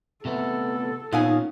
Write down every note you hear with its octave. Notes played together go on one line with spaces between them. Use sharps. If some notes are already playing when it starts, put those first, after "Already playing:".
C3 A3 B3 A4
A#2 A#3 B3 C#4 D#4 F5 G#5